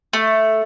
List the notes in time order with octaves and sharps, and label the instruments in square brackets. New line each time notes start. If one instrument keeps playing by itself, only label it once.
[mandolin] A3